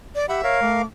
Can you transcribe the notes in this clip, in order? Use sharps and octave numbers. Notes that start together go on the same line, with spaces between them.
D5
G4 E5 F#5 B5
A#4 C#5 F5
A3 D6